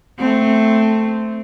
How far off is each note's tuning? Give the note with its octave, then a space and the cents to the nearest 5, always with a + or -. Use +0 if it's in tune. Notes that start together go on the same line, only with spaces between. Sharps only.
A3 +0 C4 -10